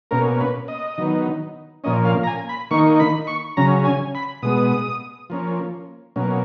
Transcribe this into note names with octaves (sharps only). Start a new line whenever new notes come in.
B2 A#3 C#4 A#4
B4
D#5
D#3 F#3 B3 D#4
A#2 F3 A#3 C#4 D#5
F5
A#5
G#5
B5
D#3 A#3 D#4 C#6
B5
C#6
C#3 F#3 C#4 A#5
G#5
B5
B2 G#3 B3 D#6
F3 A#3 C#4
B2 F#3 A#3 C#4